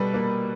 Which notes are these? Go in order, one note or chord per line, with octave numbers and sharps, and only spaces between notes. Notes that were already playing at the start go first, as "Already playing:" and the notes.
Already playing: B2 G3 A4 B4
A#3